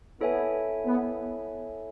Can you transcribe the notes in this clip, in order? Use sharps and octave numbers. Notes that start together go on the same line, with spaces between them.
B3 E4 A4 C#5 E5 G#5
B3